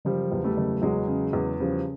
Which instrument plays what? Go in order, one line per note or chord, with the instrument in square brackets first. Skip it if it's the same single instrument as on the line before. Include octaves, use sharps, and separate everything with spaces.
[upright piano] F#1 F3 G3
E2
G3 A3
F#1
E2 F#3 G#3
C#3
E2
C#3 F3 G3